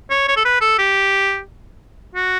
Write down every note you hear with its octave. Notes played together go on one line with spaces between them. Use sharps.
C#5
C#5
A4
B4
A4
G4
F#4